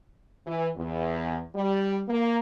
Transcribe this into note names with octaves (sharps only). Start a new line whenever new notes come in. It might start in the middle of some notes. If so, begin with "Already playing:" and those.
E3
E2
G3
A#3